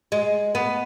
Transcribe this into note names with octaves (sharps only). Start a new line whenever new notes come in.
G#3
B3